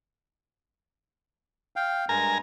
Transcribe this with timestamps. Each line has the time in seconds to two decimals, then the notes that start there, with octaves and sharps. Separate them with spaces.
1.76 F5 G5
2.09 G2 G#3 A#4 G#5 A#5